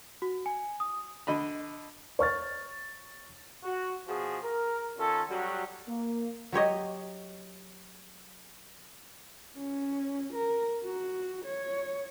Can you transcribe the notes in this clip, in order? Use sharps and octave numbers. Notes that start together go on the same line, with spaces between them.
F#4
G#5
D#6
D3 D#5 B5
C#5 C#6 F6 A6
F#4
B2 F3 F#4 G#4
A#4
D#3 C#4 F4 A4
F#3 G3 F#4
A#3
F#3 G4 C#5 D#5
C#4
A#4
F#4
C#5